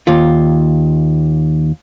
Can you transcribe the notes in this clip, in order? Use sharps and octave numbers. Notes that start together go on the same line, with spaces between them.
D#2 F4